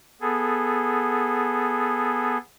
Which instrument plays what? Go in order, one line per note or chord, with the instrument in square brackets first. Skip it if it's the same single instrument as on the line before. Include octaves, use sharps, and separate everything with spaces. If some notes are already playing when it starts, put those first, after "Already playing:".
[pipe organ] B3 G#4 A4